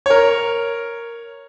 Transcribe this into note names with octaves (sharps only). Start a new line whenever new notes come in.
A#4 C#5